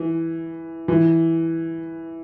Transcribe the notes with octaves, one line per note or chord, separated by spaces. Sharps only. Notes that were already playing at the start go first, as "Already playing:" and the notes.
Already playing: E3
E3